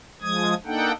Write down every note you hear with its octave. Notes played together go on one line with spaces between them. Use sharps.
F3 G#3 D#6 G#6
A#3 D4 D#4 A4 F#5 G5